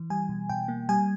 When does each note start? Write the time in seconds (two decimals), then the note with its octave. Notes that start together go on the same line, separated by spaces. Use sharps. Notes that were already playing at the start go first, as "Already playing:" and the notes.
Already playing: E3
0.10 G3 G#5
0.29 B2
0.49 B2 G5
0.68 A#3
0.89 G3 G#5